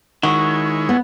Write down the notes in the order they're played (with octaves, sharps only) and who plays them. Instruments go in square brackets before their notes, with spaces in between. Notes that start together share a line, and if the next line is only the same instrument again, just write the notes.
[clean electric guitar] D#3 [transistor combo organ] G#3 E4 C#5 [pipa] F#4
[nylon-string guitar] B3